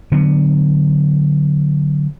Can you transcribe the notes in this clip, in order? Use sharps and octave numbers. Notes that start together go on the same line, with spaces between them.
D3 F#3 B3